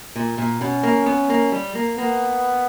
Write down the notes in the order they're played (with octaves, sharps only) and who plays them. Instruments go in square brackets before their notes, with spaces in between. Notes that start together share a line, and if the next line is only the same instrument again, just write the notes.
[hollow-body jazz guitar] A#2
A#2
[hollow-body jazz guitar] B2 [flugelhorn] C#4
[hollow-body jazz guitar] A#3
B3
A#3
G3
A#3
[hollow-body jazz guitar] A#3 [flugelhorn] B3